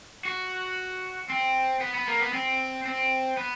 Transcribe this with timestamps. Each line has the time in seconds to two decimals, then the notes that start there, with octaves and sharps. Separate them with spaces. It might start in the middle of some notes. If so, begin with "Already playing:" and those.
0.25 F#4
1.29 C4
1.81 B3
1.95 B3
2.08 A#3
2.20 B3
2.33 C4
2.85 C4
3.37 B3